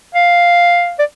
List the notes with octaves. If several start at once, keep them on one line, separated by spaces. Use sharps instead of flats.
F5
D5